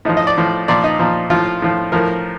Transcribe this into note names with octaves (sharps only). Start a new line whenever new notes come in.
A2 F3 D#4
D#5
D5
A2 F3
A#2 F3 D5
D#4
A#2 F3
A2 F3 F4
A2 F3
A2 F3 A#4